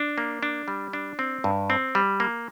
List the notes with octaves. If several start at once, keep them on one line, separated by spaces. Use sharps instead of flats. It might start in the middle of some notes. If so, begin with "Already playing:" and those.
Already playing: D4
A#3
D4
G3
D4
C4
G2
C4
G3
A#3